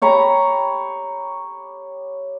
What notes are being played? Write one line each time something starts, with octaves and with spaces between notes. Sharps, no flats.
G4 C#5 A#5 B5